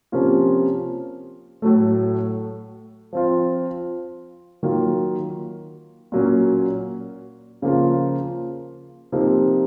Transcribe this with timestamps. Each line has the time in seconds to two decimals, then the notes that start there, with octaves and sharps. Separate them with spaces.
0.12 C3 F3 A#3 C#4 F4
1.62 A2 F#3 A3
3.13 F3 C4 F4
4.63 D#3 F#3 A#3 F4
6.12 A#2 F#3 A#3 C#4
7.62 C#3 F3 A#3 F4
9.12 C3 F3 A#3 D#4